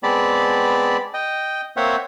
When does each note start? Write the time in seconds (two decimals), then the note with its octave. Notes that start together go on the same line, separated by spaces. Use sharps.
0.03 G#3 B3 C4 D5 A5 B5
1.14 D#5 G5
1.77 A#3 C4 C5 C#5 E5 F#5